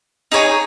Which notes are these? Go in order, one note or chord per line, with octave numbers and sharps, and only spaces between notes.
D#4 G#4 C#5 G#5